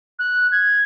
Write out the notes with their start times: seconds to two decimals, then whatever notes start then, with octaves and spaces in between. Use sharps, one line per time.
0.19 F#6
0.52 G#6